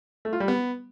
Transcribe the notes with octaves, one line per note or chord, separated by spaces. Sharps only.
A3
F4
G3
B3